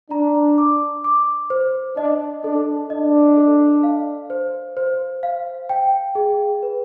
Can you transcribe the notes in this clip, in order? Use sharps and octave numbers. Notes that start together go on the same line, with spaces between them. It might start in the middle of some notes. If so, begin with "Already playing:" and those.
D4 A#5
D6
D6
C5
D4 D#5
D4 A4
D4 D#5
A4
F5
C5
C5
F5
G5
G#4
B4